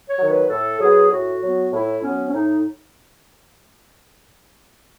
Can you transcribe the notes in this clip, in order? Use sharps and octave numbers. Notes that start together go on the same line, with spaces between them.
C#5
D#3 F#3
B4
A2 A4
F#3 B3 G#4
A2 F#4
F#3 B3
A2 E4
F#3 B3 C#4
C#4
A2 D#4